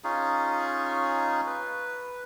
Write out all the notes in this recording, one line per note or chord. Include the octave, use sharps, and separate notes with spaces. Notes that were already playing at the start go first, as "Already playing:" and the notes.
C#4 D#4 F4 G#4
B4